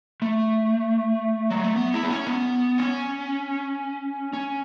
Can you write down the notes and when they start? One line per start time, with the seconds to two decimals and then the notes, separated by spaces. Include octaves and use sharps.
0.22 A3
1.50 F#3
1.64 A3
1.76 B3
1.93 E4
2.04 B3
2.10 C#4
2.27 B3
2.78 C#4
4.33 C#4